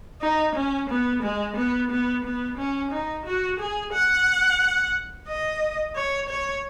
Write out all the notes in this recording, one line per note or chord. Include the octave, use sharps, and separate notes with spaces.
D#4
C#4
B3
G#3
B3
B3
B3
C#4
D#4
F#4
G#4
F#5
D#5
C#5
C#5